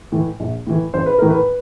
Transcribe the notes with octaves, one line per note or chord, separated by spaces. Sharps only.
A2 E3
A#1
A2 E3
A1 C5
B4
A2 E3 A#4
B4